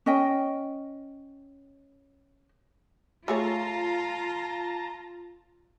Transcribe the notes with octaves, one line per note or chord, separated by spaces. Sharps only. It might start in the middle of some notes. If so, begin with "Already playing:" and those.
C#4 D#5 G5
A3 F4 G#4 C#5 A5 A#5